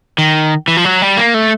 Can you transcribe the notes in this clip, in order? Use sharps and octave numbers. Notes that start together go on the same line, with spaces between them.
D#3
E3
F3
F#3
G3
A#3
A3